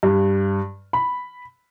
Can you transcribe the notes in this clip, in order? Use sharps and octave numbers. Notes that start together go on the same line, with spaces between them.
G2
B5